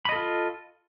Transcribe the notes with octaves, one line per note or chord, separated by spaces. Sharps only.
F4 A4 D#5 B5